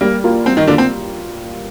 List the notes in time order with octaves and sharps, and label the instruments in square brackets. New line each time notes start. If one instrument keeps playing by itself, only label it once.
[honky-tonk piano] G3 [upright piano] A#3
[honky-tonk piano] A#3 F4
[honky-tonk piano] G3 [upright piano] C4
[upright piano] D#3 D#4
[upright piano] D3 D4 [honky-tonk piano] A#3 F4
[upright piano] C4